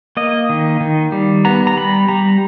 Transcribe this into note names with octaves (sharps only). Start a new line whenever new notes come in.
A#3 D#5
D#3
D#3
G3
B3 A#5
A#5
G3 B5
G3 A#5